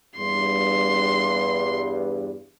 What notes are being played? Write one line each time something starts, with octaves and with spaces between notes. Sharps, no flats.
E2 G2 C6